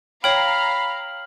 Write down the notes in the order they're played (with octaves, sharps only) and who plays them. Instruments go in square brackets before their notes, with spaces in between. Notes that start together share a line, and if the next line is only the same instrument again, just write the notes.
[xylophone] C#5 G5 [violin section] F5 A#5 [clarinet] B5 [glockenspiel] F6 F#7